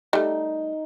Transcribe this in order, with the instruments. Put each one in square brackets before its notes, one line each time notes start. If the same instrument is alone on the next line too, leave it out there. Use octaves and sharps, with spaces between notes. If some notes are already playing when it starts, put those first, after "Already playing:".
[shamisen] G3 A3 [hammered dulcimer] D#4